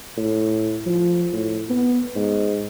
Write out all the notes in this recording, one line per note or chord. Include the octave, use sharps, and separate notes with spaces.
A2
F3
A2
B3
G#2